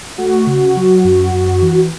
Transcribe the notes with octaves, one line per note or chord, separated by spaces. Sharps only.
A3 F#4
C#3
F#3
F#2
F#2
E3